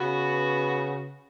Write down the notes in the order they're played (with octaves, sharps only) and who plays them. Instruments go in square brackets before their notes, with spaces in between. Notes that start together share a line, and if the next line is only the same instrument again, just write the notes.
[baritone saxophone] C#3 [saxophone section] B3 F#4